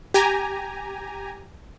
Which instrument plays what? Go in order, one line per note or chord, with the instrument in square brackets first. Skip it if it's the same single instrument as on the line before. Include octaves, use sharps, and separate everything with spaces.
[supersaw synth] G4 G#5 A#5